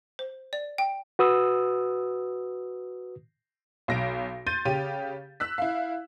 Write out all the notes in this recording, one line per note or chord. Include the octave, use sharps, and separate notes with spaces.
C5
D5
G5
F#4 B4 D#6 E6
B1 A#6 D7
C6 G6 A6 D#7
C#3 G4 D#7
E6 F#6 B6
E4 F5